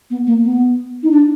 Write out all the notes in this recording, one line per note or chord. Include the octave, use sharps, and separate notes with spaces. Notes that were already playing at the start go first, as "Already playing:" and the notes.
B3
A#3
B3
D#4
D4